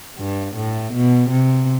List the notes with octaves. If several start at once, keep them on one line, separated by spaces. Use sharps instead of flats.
G2
A2
B2
C3